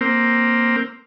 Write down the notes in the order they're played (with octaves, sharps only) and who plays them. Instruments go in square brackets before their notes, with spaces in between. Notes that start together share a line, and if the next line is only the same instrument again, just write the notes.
[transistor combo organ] A#3 C4